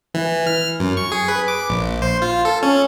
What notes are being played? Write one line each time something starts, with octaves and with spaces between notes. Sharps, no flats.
E3
F6
F#2
C#6
G#4
B4
D6
A#1
C5
F4
A4
C#4